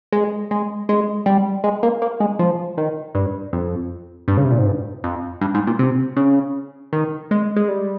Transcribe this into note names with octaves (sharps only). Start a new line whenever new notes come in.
G#3
G#3
G#3
G3
G#3
A#3
A#3
G#3
F3
D#3
G2
F2
G2
C#3
C3
A#2
G#2
G2
F2
G2
G#2
A#2
C3
C#3
D#3
G#3
G#3
G3